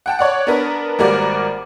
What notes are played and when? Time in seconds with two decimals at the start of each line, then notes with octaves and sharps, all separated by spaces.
0.06 F#5 G5 A5
0.19 C#5 D5 F#5
0.47 B3 D4 A#4 B4
0.99 G#1 G3 A#3 F#4 A#4 D5